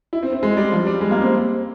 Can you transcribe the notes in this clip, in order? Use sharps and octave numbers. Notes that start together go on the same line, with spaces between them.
E4
C4
C4
G#3
G3
F3
G3
G#3
A#3
C4